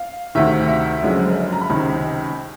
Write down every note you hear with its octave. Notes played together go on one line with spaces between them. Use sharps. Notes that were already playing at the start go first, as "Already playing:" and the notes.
Already playing: F5
D2 C3 D#3 E5
E5
F#1 F#2 D3 F3 G#3
A#5
B5
C#2 C3 D#3